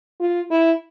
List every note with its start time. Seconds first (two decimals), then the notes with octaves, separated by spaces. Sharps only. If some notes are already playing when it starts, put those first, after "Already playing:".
0.20 F4
0.51 E4